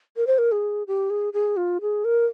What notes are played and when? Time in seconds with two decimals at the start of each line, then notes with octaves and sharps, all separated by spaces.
0.16 A#4
0.27 C5
0.38 A#4
0.52 G#4
0.87 G4
1.10 G#4
1.33 G#4
1.57 F4
1.81 G#4
2.04 A#4